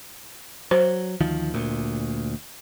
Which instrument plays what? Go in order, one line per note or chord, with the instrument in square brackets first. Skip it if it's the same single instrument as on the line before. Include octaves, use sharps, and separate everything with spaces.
[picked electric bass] F#3 [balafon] C5
[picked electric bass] D2 D#3 F3
D2 A#2